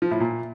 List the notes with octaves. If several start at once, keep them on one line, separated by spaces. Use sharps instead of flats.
F3
A2
A#2